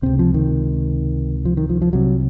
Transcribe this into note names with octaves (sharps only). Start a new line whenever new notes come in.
C#2 C3 C4
F3
D#3
F3
D#3
F3
F3
C2 C3 F#3